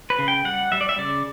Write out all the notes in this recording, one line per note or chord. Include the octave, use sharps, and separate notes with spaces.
B4
C#3
G5
G3 F#5
G3 E5
D5
E5
C#3 D5